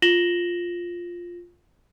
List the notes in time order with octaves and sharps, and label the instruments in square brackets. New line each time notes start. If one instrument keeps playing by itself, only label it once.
[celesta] F4 A#6 E7 F#7 G7